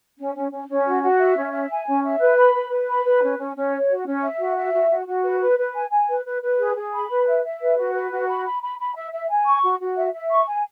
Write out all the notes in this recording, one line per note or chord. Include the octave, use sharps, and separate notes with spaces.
C#4
C#4
C#4
C#4
F#4
F#4
E5
C#4
E5
G#5
C#4
E5
B4
B5
B4
B4
B5
B4
C#4
C#4
C#4
C#5
F#4
C#4
E5
F#4
E5
F#4
F#4
F#4
B4
B4
B4
G#5
G#5
B4
B4
B4
G#4
G#4
B5
B4
E5
E5
B4
F#4
B4
F#4
B5
B5
B5
B5
E5
E5
G#5
C#6
F#4
F#4
E5
E5
C#6
G#5